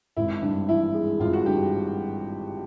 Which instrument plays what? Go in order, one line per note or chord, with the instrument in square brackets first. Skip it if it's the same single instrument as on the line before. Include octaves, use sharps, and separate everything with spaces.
[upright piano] G#1 [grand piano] E4
[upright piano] G2
[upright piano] E3 [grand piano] E4
[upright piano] G#3
[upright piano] G#1 [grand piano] F4
[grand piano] F#4
[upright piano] G2 [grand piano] G4